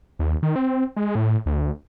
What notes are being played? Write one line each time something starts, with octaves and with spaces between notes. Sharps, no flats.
D#2
D#3
C4
G#3
A2
D2